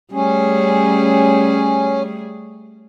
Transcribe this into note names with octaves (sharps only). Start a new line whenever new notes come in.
G3 A3 C#4 G#4